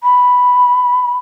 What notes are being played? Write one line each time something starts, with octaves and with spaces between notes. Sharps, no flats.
B5